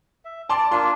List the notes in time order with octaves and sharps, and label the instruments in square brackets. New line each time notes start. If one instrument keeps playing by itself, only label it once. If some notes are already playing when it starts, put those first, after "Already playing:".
[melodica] E5
[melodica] D5 [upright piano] A5 C6 D6
[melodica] A#3 D4 F4 [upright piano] C6